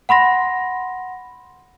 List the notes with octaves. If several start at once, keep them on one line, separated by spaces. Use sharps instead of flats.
F#5 B5 C6 A#6